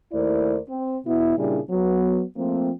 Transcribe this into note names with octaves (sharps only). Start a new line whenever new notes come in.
D#2 A3 E4 A#4 C5 D5
C4
B2 B3 E4
A#2 C#3 G3 D4 E4 G#4
F#3 B3
F3 A3 A#3 C4